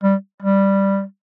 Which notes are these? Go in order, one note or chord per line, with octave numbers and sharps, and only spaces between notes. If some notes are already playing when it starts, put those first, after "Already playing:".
G3
G3